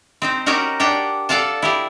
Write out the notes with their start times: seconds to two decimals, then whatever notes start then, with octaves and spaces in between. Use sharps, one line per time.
0.22 C4 D#4 C5
0.46 C#4 D#4 F#4 G4 A#4 F#5
0.80 D4 G4 F#5 G5
1.29 A4 D5 F5 F#5 A5
1.62 E4 G4 G#4